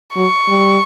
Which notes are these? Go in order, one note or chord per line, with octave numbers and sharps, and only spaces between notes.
F#3 C#6
G3